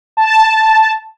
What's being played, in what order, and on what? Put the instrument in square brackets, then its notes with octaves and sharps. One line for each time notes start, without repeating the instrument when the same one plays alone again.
[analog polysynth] A5